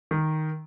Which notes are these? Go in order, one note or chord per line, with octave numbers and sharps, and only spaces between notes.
D#3